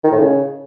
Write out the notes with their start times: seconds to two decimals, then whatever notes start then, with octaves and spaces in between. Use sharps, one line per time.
0.04 D#3
0.12 A2
0.20 C#3